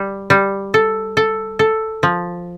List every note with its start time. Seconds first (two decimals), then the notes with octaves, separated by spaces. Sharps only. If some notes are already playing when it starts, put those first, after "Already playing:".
Already playing: G3
0.30 G3
0.74 A4
1.17 A4
1.59 A4
2.03 F3